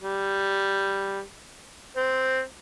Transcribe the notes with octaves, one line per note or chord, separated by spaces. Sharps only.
G3
C4